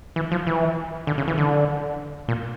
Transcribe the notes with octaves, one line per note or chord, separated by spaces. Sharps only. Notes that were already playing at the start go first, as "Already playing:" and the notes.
E3
F3
E3
D3
C#3
E3
D3
A#2